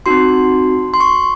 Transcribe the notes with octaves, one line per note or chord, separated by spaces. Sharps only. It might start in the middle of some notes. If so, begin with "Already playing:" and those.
C4 D#4 F#4 C6
C6
C#6